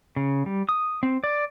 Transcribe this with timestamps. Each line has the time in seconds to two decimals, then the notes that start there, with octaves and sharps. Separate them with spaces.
0.16 C#3
0.46 G3
0.69 D#6
1.03 C4
1.24 D5